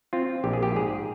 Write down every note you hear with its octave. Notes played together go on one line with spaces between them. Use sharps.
C4 F4
A#1 G4
G#4
G4
G#2 G#4